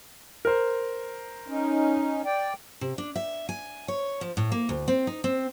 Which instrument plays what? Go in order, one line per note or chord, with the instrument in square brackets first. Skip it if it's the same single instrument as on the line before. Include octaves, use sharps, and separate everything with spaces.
[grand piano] A#4 C5
[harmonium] C#4 D#4
D5 G5
[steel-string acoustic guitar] C3
D4
E5
G#5
C#5
F3
A2
A#3
D2
C4
D#4
C4